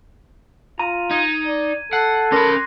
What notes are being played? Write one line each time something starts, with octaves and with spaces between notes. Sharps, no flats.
F4 A#5 D#7
D#4 G#6 D#7
D5
A4 F#5 F#6 C7
B1 C#4 A#4 B5 C6 D6 A#6